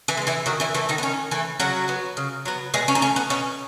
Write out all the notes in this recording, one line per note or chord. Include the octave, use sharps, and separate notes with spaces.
E3 E4
G#3
B3
E3 E4
D#3 F#3 F#4
E3 E4
E3 A3 E4
D#3 D#4
B3
D#3 C#4
E3 A3 E4
C#3 F#3 F#4
F#3 B3
C#3
F#3 B3
B2 G#3 G#4
C#4
D#4
A3 C#4
B3
B2 C#4